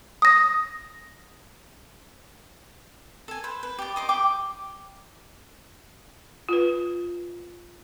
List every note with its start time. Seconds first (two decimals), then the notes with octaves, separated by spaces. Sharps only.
0.22 D#6 A#6
3.28 A4 G#5
3.44 B4 C5
3.63 B4
3.78 G4 D5
3.96 D#5 C6 D6
4.09 G4 G5 D6
6.49 F4 B4